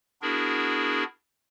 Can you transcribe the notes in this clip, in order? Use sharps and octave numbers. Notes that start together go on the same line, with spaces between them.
B3 D4 E4 F#4 G#4 A#4